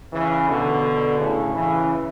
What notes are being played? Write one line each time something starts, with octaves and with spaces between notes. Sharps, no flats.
C#3 E3
B2 D3
A2 C#3
C#3 E3